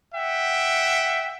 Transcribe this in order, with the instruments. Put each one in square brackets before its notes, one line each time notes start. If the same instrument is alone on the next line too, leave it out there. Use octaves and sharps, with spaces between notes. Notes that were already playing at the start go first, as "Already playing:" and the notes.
[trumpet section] E5 F#5 G5